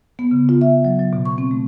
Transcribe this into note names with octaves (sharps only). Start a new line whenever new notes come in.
B3
C#3
F4
E5
F#3
F#3
B2
C#6
C4
A3